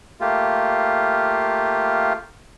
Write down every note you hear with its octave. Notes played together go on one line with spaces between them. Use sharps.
A3 A#3 F4 G4